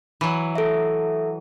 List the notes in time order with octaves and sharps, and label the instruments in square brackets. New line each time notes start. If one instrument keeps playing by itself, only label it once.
[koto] E3 F#3
[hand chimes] A4 E5